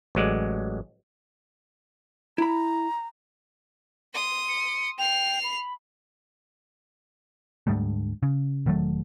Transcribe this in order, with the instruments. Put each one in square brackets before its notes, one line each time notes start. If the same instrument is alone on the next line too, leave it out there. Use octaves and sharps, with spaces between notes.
[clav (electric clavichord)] A1 F#3 G#3 D5
[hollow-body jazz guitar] E4 B5 [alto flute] A#5
[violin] C6 D#6
[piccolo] C#7
[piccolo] G5 [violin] C7 F7
[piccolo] B5
[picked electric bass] D2 G#2 G3 A3
C#3
E1 D#3 F#3 A3